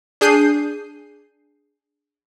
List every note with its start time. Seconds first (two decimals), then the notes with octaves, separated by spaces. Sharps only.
0.21 D4 G#4 G6 C7 D#7